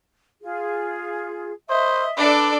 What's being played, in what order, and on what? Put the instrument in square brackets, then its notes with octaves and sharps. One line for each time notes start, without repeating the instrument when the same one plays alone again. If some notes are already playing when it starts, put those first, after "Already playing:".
[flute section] F4 G#4
[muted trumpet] C5 [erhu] D#5 [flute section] E5
[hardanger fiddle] D4 A4 [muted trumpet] B4 [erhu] D5